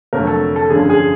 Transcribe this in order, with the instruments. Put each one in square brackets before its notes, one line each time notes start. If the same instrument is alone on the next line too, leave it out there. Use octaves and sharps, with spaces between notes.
[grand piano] F1 F2 D3 F#3 A3 A#4
A4
A4
G1 F#2 D3 F3 G#4
G#4